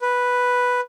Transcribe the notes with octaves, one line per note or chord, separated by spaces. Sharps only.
B4